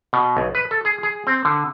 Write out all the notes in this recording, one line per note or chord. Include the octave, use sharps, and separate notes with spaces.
B2
B1
B4
A4
G#4
G#4
C4
D3